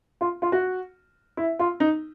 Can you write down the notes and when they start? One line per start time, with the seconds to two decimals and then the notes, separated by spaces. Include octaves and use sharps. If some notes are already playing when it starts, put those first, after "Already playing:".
0.21 F4
0.42 F4
0.52 F#4
1.37 E4
1.59 F4
1.80 D#4